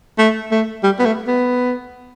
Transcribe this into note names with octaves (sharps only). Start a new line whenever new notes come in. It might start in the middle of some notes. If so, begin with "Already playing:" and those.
A3
A3
G3
B3
A3
B3